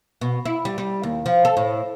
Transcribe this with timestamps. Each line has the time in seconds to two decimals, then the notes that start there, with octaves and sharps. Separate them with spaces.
0.21 B2
0.45 E4
0.65 G3
0.78 G3
1.03 D#2
1.26 F3
1.45 A4
1.57 A2